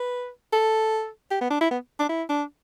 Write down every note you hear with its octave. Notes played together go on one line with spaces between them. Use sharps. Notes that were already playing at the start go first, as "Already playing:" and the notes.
Already playing: B4
A4
G4
B3
D4
E4
B3
D4
E4
D4